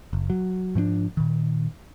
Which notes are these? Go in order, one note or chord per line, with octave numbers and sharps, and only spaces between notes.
F#1
F#3
G#2 F3 C4 D4
A#2 D#3